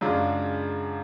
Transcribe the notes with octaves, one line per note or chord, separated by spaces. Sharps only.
F#2 C#3 G#3 D4 F4